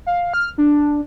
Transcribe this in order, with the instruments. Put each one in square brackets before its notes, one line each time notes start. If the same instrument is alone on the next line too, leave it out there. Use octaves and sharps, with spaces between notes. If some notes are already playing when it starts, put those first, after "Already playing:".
[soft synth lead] F5
F6
D4